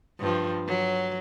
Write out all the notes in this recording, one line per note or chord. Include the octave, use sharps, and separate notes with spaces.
G2 F3
F#3